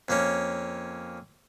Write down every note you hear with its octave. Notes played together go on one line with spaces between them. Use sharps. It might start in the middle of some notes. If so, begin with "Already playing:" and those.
F2 A#3 C#4